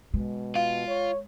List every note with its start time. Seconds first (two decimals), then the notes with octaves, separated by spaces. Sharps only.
0.14 B2 G#3
0.55 F4 F5
0.88 C#5